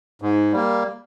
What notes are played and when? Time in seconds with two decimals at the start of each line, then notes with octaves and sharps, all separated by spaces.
0.22 G#2
0.53 G3 A#3